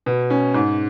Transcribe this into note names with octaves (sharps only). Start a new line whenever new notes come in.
B2
C#4
G#2